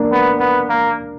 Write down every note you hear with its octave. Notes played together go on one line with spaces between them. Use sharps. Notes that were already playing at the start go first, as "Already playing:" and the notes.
Already playing: A#3 D4
B3
B3
A#3